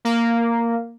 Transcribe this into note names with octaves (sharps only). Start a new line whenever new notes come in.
A#3